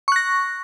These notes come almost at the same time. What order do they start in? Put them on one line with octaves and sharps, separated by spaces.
C#6 F#6 A#6